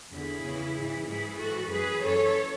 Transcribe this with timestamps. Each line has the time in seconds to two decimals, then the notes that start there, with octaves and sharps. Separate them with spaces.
0.13 E2 D3 E4 G#4
0.45 E2 C#3 E3
0.77 G#2 E3
1.08 G#2 E3 E4 G#4
1.39 G#2 E3 F#4 A4
1.70 F#2 E3 G#4 B4
2.02 F#2 E3 A4 C#5